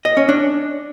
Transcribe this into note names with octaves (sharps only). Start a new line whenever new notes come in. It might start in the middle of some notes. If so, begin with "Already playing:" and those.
D#5
C#4
D4